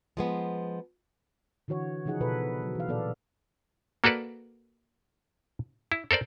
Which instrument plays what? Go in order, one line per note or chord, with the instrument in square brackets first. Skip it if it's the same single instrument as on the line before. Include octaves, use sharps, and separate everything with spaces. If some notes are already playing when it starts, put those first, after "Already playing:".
[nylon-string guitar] F3 G#3 B3
[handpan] D3 E3 F#4 C#5
C#3 F3 D#4 G#4 F#5
B2 A4 B4
F#3
E3 F5
A#2 B3 A4 D5
[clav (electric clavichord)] A#3 F#4 A4 B4 D5
E4
A4 A#4 C5 D5